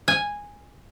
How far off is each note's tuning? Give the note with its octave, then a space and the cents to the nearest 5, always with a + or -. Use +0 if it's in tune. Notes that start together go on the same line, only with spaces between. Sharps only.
G#5 -10